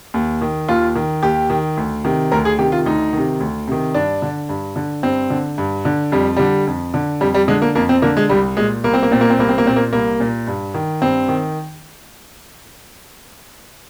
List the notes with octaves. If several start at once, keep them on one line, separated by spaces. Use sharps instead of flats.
D#2
D#3
D#2 F4
D#3
D#2 G4
D#3
D2
C3 D#3
D2 A#4
G#4
C3 D#3 G4
F4
D2 D#4
C3 D#3
D2
C3 D#3
G2 D4
D3
G2
D3
G2 C4
D3
G2
D3
F2 G3
D3 G3
F2
D3
F2 G3
G3
D3 G#3
A#3
F2 A#3
C4
D3 A#3
G#3
C2 G3
A#2 G#3
C2 A#3
C4
A#3
A#2 C4
A#3
C4
C2 A#3
C4
A#3
A#2 C4
A#3
C2 A#3
A#2
G2
D#3
G2 C4
D#3